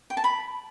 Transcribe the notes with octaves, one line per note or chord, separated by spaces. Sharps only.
G5
A5
B5